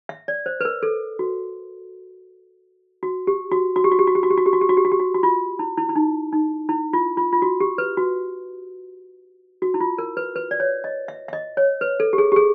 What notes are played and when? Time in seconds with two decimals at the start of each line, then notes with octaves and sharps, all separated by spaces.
0.09 E5
0.28 D5
0.46 C5
0.61 B4
0.65 A#4
0.83 A4
1.19 F#4
3.03 F#4
3.27 G4
3.52 F#4
3.76 F#4
3.84 G4
3.91 F#4
3.99 G4
4.07 F#4
4.15 G4
4.23 F#4
4.30 G4
4.38 F#4
4.46 G4
4.53 F#4
4.61 G4
4.69 F#4
4.77 G4
4.85 F#4
4.92 G4
5.00 F#4
5.14 F#4
5.23 F4
5.59 E4
5.78 E4
5.89 E4
5.96 D#4
6.33 D#4
6.69 E4
6.93 F4
7.17 F4
7.33 F4
7.42 F#4
7.60 G4
7.78 B4
7.97 F#4
9.62 F#4
9.74 E4
9.80 F4
9.98 A#4
10.17 B4
10.36 B4
10.51 D5
10.60 C#5
10.84 D#5
11.08 E5
11.28 E5
11.33 D#5
11.57 C#5
11.81 B4
12.00 A4
12.13 G4
12.18 G#4
12.32 G4
12.36 G#4